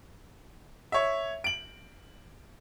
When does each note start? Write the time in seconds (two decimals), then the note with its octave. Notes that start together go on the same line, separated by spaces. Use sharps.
0.92 C#5 E5
1.44 D7 F#7